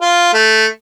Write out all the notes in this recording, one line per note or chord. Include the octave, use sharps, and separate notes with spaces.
F4
A3